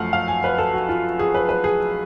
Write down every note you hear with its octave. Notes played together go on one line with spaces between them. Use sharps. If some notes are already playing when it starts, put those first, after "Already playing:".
Already playing: F#2 F3 A3 F5 F#5
F5
G#5
B4
A4
F#4
F4
G#4
B4
B4
G#4